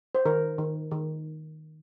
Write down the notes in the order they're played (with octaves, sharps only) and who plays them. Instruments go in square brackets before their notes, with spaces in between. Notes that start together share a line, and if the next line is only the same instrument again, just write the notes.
[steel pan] C5
D#3 A#4
D#3
D#3